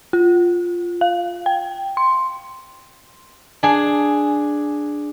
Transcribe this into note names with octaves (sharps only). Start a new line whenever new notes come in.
F4
F5
G5
C6
D4 G#4